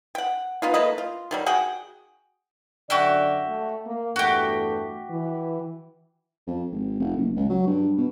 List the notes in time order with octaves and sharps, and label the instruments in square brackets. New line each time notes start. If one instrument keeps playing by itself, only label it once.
[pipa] F#5 G5
B3 D#4 F4
A3 A#3 B4 D#5
F4
D#3 F#3 G3
F#4 G#4 F#5 G5
[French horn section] F#2 D3 D5 [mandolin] F#4 G4 E5
[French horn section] A3
A#3
[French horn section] E2 G2 A3 [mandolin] F#4 G4
[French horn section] E3
[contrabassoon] F2
G#1
F1
F#1
C#2
F#3
G2
B2